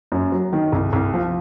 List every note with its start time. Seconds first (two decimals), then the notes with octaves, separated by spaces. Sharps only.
0.12 F#2
0.32 F#3
0.53 D#3
0.72 C2
0.93 C2
1.14 F3